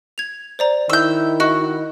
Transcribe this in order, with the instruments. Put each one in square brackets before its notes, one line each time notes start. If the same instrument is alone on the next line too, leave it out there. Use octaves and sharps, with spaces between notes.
[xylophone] G#6 F7
C5 D5 A#5
[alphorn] D#3 [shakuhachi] E4 [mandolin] E6 G6
[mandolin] F#4 [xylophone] D#5